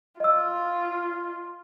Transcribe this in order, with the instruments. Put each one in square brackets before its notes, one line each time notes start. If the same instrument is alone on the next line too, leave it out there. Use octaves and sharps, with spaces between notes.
[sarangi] F4 [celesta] D#5 E6